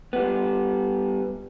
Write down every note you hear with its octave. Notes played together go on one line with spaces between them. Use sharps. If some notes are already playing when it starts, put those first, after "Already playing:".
G3 B3